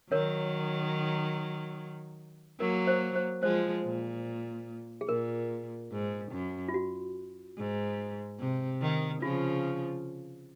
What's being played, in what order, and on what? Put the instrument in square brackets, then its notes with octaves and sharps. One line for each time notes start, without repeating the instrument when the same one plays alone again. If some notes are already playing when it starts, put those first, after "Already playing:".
[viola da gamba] D#3 F#3 [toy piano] A#4 C#5
[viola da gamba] F#3 A#3 [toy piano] A#4
[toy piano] C5
C5
[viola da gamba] F3 G#3 [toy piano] C5
[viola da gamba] A#2
[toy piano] G#4
[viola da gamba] A#2 [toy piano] A#4
[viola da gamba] G#2
F#2
[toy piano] F4
F#4
[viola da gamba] G#2
C3
D#3
[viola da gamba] C#3 F3 [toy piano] F4